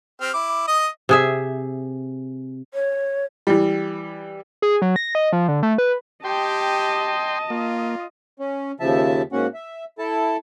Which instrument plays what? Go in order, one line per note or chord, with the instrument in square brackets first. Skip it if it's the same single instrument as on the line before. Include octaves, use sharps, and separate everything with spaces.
[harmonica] C4 G4 F6
E4 D6
D#5 D#6
[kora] C3 G#4 E5
[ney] C#5
[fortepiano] E3 G3
[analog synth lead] G#4
F#3
A#6
D#5
F3
D3
A3
B4
[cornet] G4 [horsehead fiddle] D#5 [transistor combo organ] G5 C6 [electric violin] A5
[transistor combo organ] A#3 [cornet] F4
[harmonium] C#4
D#2 C#3 F3 E5 A5
G#2 A#3 C#4 F#4 F#5
E5
E4 A4 A5